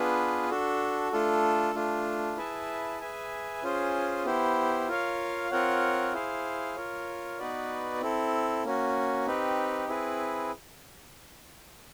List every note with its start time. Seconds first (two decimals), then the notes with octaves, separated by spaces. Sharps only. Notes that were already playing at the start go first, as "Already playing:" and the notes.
Already playing: B3 D4 F4 G#4 B4
0.50 D4 F#4 A4
1.12 A3 D4 F4 A4
1.75 A3 D4 F4
2.37 E4 G#4 B4 E5 A5
3.01 G#4 B4 E5 G#5
3.63 C#4 F4 G#4 C5
4.25 B3 E4 G4 C5
4.88 F4 A#4 C#5 F5
5.51 C4 F4 A#4 C#5 F#5
6.13 E4 G#4 C5 F5
6.76 F4 A#4 C#5
7.39 B3 D#4 F#4 B4 D5
8.01 C4 E4 A4
8.64 A#3 C#4 F#4
9.26 C4 D#4 G4 B4
9.89 C4 E4 G#4 B4